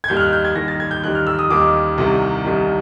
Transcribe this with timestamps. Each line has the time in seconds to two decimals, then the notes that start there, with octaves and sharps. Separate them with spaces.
0.04 G#6
0.08 D#2 D#3 G3 G6
0.17 F6
0.20 F#6
0.33 G6
0.45 G#6
0.55 D#2 D#3 G3 A#6
0.68 A6
0.80 G#6
0.91 G6
1.04 D#2 D#3 G3 F#6
1.15 F6
1.27 E6
1.39 D#6
1.50 D#2 D#3 G3 D6
1.98 C2 C3 D#3 G3
2.45 C2 C3 D#3 G3